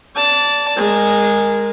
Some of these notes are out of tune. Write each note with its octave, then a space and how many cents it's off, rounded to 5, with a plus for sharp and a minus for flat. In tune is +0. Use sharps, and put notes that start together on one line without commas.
D5 -25 A5 +0
G#3 -10 A#4 +0